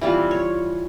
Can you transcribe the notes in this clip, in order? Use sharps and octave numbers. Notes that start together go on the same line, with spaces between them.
E3 G3 C4 F4
C#5